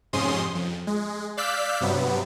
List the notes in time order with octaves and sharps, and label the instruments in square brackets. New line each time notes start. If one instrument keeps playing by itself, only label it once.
[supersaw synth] F2 G#2 C3 C#4 C6 D#6
F2
G#3
D5 F5 E6 F#6 G6 B6
G2 C3 F#3 B3